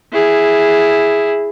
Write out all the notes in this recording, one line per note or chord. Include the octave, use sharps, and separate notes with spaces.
E4 G#4